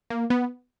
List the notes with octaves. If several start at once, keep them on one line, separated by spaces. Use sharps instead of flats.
A#3
B3